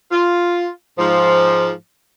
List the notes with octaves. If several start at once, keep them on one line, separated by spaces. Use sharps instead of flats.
F4
G#2 F3